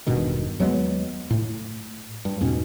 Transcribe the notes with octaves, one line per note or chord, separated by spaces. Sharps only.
E1 G2 B2 D#3
D#2 F#3 G#3 B3
A2
G2
E2 G#2 B2 C#4